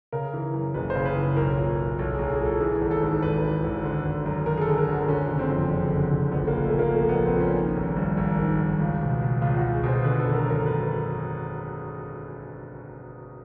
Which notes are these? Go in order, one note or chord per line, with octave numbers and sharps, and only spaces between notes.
C#3 A#4
E3
F#2
F#1 B4
C5
C#3
B4
E3
B1 A#4
A#2
A#2
B1 A4
B1 G#4
G#4
A#2 A4
E3 G#4
G#1
A4
G#2
G#1 B4
E3
G#1
D3
G#1
F#2
G#1 A#4
G#4
A4
D3
A#4
G#1 F#4
D3 C#4
F#1
C4
F2
F#1
D3
F#1
A#1 B3
A#2 A#3
A3
A#2
A#3
A#1
B3
A#1
C4
A#2 C#4
D#3
G#1
G2
G#1
D#3
G#1
C#2
B2
B2
C#2 F4
F#4
C#2
G#4
B2 C5
D3 B4
A4
G#1
A#4
F#2 A#4
B4